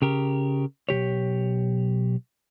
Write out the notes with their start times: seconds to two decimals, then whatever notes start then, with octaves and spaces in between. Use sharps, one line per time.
0.02 C#3 G4 A#4
0.89 B1 C#3 G4 C#5